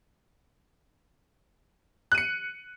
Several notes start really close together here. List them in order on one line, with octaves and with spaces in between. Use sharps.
F#6 D#7 C#7